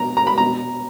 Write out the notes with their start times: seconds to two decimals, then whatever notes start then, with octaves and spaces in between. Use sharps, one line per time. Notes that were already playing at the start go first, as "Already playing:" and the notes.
Already playing: B2 A#5
0.17 A#5
0.27 B5
0.38 B2 A#5